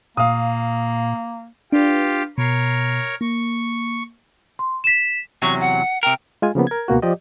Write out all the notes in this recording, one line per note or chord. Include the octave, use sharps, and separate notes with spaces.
A#2 A#3 F5 D#6
D4 F4 G4 B4
B2 A#4 C#5 C7
A#3 C#6
C6
B6 E7
E2 C3 F#3 C#6
F#5
C3 A#4 G5
G#3 F4 G#5
C#3 F3 A#3 B3
A#4 G#6
C#2 B2 A#3 F#4
F3 G4 D5 D#5